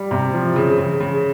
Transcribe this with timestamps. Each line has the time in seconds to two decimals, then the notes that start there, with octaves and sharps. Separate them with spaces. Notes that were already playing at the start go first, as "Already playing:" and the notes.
Already playing: G3
0.11 C3
0.33 F3
0.56 C#3
0.78 C#3
1.00 C#3